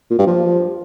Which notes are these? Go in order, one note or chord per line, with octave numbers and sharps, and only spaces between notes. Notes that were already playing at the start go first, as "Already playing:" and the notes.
A#2
G2
F3